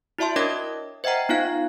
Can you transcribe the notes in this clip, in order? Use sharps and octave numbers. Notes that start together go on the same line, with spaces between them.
E4 F#4 D5 E5 A5 C6
D4 A#4 C#5 D#5 D6 A#6
C5 D#5 E5 F#5 G5 A#5
B3 D#4 F4 F5 F#6